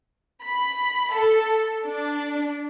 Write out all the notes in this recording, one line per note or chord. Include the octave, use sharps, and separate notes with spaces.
B5
A4
D4